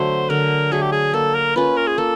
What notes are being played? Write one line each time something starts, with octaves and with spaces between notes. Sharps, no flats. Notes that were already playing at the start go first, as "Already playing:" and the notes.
Already playing: D3 F#3 A3 C5
D3 A#4
F#3 A3 G#4
G4
G#4
A#3 A4
A#4
C#4 F4 B4
A#4
G#4
A#3 A4